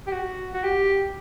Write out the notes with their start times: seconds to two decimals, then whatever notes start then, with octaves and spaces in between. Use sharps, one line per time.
0.07 G4
0.13 F#4
0.54 F#4
0.64 G4